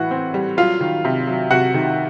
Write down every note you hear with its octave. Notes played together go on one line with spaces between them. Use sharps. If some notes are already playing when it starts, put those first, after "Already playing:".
Already playing: A2 E3 F#4 F#5
C4
G3
F#3 F4 F5
D#3
C3
F#3
C3 F#4 F#5
D#3